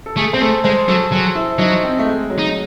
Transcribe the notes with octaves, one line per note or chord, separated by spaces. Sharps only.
A4
A3 G#4
C4 C5
A3 A4
G#3 C5
F#3 A4
F#3 G#4
E4
F#3 D#4
C4
A3
G#3
F#3
D#4